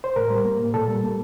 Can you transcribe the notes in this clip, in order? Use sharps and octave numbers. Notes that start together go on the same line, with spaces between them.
C5
A2 A#4
G3
A#3
A2
A#2 A4
G3
A#3